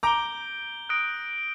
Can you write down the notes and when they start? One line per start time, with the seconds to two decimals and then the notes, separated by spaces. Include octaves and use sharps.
0.03 A#5 D6 G6 D7 G7
0.89 D#6 F#6 A#6 D7